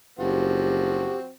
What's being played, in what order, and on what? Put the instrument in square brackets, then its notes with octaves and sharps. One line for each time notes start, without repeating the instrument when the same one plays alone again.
[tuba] F#1 [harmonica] F3 C4 F#4 [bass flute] G4